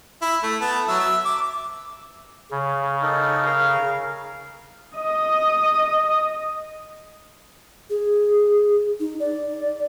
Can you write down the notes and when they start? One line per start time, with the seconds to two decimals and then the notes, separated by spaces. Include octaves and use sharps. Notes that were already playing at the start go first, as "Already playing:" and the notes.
0.22 E4
0.43 A3
0.61 B3 A5
0.88 F#3 E5
1.00 E5
1.25 D6
2.51 C#3
3.02 D#4 A4 A#4
3.46 A#4 F5
4.97 D#5 D#6
7.90 G#4
9.00 D#4
9.20 D5